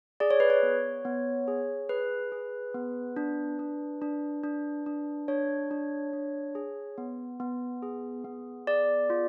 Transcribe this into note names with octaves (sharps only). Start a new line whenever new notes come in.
G#4 D5
C#5
B4
C#5
B3
B3
G#4
G#4 B4
G#4
B3
D4
D4
D4
D4
D4
D4 C#5
D4
D4
G#4
B3
B3
G#4
B3
G#4 D5
F4